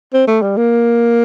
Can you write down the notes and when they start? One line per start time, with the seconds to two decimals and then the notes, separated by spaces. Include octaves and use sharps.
0.13 C4
0.27 A3
0.42 G3
0.57 A#3